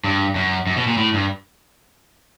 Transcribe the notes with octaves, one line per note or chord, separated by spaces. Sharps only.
G2
F#2
F#2
B2
A#2
A2
G2